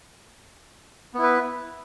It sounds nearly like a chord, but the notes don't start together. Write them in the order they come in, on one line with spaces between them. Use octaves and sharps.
B3 E4 B4